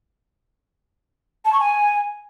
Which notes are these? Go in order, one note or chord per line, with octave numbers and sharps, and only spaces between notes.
A5
C#6
G#5